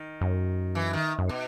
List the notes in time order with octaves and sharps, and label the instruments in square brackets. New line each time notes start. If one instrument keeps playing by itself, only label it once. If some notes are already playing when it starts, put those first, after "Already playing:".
Already playing: [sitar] D#3
[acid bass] F#2
[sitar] E3
D#3
[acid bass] F#2
[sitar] B2